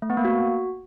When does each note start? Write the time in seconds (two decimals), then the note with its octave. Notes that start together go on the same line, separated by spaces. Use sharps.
0.02 A3
0.10 B3
0.17 A#3
0.25 F#4